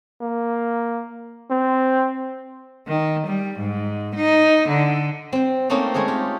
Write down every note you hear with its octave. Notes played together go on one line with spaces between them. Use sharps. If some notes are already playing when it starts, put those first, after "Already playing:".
A#3
C4
D#3
G3
G#2
D#4
D3
C4 G5
A3 A#3 C4 C#4 D#4
G#3 A3 C#4 G#4
F4 G4